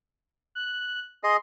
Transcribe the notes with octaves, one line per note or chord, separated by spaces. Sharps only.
F#6
G#4 D#5 C6